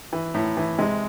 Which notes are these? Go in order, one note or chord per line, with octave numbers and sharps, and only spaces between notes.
E3
A2
E3
C3 G#3